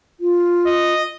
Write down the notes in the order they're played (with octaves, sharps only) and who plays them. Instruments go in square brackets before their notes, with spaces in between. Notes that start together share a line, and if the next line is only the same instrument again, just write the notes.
[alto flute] F4
[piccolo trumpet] D#5